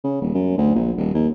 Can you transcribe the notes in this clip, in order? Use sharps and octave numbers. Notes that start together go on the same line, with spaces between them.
C#3
D#1
F#2
D2
A#1
D#1
D#2